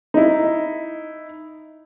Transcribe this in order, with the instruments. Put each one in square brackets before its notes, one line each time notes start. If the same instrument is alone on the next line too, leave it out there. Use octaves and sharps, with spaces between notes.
[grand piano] D#4 E4